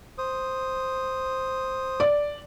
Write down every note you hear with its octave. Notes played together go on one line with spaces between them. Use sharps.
C5 D#6
D5